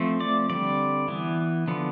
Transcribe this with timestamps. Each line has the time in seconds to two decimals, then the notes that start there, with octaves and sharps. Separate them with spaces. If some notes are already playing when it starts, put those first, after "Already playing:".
Already playing: F3 A3 C4
0.20 D5
0.50 D3 G3 C4 D5
1.08 E3 B3
1.68 D3 F3 B3